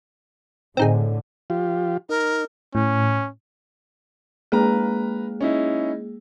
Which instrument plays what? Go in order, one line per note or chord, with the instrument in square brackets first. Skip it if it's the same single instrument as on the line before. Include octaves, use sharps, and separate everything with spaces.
[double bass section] A2 D3 [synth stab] C4 D#4 G#4
[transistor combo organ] F3 F4 G4
[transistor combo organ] D#4 [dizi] A#4
[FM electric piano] A2 [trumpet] C#4
[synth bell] G#3 A#3 G#4 [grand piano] B4 A#5
[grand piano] C#4 D#4 E4